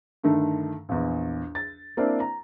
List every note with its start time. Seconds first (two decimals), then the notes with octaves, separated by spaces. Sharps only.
0.23 G2 D3 D#3 A3
0.89 A#1 E2
1.55 A6
1.97 A#3 C4 D4 E4 D5 F5
2.20 A#5